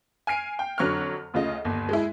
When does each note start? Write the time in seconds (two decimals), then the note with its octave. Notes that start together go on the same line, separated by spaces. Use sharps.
0.27 G#5 F6 C7 D7
0.59 G5
0.78 F2 D3 F#3 C#6 F6
1.34 D2 C#3 F4 D#5
1.65 G1 D#2
1.89 G#3 E4